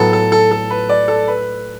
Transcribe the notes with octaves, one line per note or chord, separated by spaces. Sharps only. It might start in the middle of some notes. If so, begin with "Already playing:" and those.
Already playing: A2 F#3 B3 A4 A5
A4
A4
A4
B4
D5
A4
B4